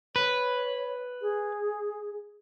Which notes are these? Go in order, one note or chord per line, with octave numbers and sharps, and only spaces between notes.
B4 C#5
G#4